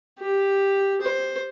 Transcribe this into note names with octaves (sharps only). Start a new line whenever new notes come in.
G4
C5